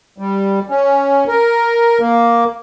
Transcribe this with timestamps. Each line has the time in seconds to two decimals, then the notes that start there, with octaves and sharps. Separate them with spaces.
0.18 G3
0.70 C#4
1.27 A#4
2.00 A#3